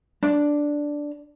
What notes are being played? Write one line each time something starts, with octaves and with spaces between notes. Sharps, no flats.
D4